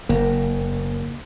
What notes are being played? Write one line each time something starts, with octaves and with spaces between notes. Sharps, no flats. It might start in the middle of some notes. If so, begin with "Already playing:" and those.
F#1 A#3